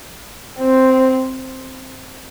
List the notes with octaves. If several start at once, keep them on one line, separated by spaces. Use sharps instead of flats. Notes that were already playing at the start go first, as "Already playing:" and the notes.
C4